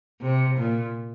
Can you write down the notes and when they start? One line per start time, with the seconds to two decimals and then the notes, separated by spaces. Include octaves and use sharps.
0.21 C3
0.57 A#2